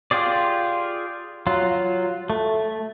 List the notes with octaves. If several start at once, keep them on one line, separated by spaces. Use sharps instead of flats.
F4 G4 G#4 D5
F#3 F4
A3